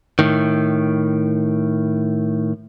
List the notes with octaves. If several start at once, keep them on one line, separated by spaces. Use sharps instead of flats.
A2 D#3